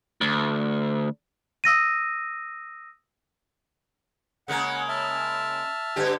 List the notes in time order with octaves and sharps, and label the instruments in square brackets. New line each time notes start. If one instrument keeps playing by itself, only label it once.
[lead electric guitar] D2
[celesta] D#6 E6 A#6 D#7
[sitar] C#3 G#3 A#3 [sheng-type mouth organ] F#5
[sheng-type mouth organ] E5 A5 F6
[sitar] G2 D3 G4